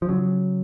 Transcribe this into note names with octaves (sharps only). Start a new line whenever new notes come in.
F3
C#3 F#3